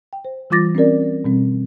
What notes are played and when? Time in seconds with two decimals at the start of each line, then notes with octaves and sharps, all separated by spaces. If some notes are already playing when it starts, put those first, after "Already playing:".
0.13 G5
0.25 C5
0.50 E3 G3 F4 D6 A6 A#6
0.75 C4 C#4 G4 A#4 D5
1.24 B2 G3 C4